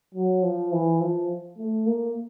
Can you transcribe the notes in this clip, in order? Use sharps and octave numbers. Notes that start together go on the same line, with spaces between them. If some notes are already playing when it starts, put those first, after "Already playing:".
F#3
F3
E3
F3
A3
A#3